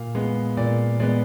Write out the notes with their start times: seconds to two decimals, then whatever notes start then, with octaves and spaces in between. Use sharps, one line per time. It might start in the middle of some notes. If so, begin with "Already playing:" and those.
Already playing: A#2 F5
0.15 G#3 B3
0.57 A#2 D5
1.00 G#3 B3 D5